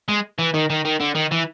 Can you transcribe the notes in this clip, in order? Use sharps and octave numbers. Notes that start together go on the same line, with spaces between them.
G#3
E3
D#3
D#3
D#3
D3
D#3
E3